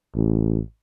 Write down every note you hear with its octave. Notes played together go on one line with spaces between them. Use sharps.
A1